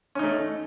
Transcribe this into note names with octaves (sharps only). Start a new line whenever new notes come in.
A3 C#4 D#4